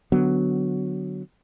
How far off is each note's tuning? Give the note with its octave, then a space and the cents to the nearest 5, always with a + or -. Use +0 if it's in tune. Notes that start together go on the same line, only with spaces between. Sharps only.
D3 +0 F#3 +0 B3 +10